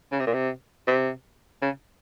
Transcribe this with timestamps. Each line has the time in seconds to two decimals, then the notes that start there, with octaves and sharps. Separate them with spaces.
0.12 C#3
0.20 C3
0.27 A#2
0.33 C3
0.87 C3
1.62 C#3